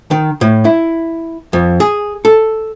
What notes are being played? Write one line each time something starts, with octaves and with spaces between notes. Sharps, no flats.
D#3
A2
E4
F2
G#4
A4